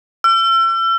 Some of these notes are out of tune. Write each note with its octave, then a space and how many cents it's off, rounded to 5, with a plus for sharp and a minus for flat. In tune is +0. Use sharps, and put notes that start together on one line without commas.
E6 +40